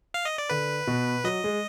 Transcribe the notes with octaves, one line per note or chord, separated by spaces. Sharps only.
F5
D#5
D5
D3 B4
B2
F#3 D#5
G#3